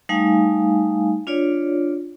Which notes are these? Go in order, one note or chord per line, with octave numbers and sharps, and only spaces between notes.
G3 A3 D#4 F5 G#5
D4 F4 C#5 D5